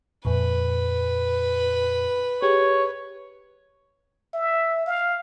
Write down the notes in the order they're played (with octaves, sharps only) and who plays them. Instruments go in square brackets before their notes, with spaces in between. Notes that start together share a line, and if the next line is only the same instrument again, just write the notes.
[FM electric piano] F2 A#2 [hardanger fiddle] B4
[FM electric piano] G4 G#4 [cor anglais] C#5
[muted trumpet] E5
F5